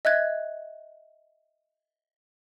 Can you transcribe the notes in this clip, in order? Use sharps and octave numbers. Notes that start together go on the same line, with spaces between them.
D#5 E5 F#6 G#6